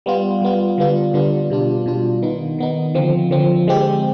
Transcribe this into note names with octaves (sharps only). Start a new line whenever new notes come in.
G3 B3 F4
G3 B3 F4
D3 G3 B3 D4 F4
D3 G3 B3 D4 F4
B2 G3 D4 F4
B2 G3 D4 F4
D#3 B3 D#4
D#3 B3 D#4
D3 F3 C4
D3 F3 C4
D3 G#3 C4 G4